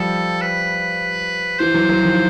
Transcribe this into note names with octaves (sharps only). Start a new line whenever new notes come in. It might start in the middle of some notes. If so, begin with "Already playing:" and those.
Already playing: F3 G3 A4
B4
E3 C5
E3 F#3
E3 F#3
D#3 F3